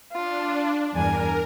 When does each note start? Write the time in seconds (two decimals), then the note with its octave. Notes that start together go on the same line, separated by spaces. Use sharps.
0.13 D4 F4
0.93 E2 G2 A#4 G#5